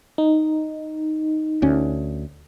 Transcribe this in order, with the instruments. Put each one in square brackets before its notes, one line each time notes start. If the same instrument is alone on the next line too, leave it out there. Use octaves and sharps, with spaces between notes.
[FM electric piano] D#4
[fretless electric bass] D2 C#4